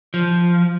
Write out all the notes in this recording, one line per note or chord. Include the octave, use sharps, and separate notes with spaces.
F3